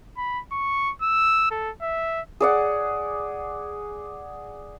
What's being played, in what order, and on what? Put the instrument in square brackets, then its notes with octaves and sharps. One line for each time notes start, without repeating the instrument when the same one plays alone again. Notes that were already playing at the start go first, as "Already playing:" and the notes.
[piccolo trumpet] B5
C#6
E6
A4
E5
[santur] G#4 D5 F#5